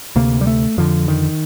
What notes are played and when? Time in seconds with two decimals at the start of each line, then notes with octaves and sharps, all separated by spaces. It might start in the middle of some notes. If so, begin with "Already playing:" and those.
0.16 D2 C3 A#3
0.41 G3
0.47 A3
0.78 F2 D3 F3
1.08 D#3